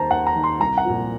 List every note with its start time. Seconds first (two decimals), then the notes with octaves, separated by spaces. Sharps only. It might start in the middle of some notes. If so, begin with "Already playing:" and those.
Already playing: D#2 D#3 C5 A5 A#5
0.10 D#2 F#5
0.27 A#5
0.36 D#3
0.44 C6
0.60 C2 A#5
0.78 F#5
0.85 A#2 F3